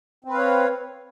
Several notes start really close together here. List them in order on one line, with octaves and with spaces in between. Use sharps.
C4 B4 F5 C#5